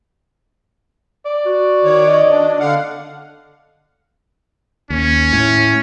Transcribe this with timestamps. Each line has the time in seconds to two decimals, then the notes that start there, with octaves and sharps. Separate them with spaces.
1.25 D5
1.46 F#4
1.84 D#3 C#5
2.07 D#5
2.31 D4
2.60 D3 F5 F#5
4.90 D#2 C#4
5.33 A2